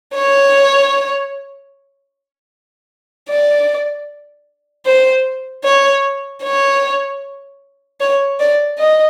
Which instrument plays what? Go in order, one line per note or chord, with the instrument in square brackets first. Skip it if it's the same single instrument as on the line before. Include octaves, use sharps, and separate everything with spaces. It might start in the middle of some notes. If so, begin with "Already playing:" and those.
[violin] C#5
D5
C5
C#5
C#5
C#5
D5
D#5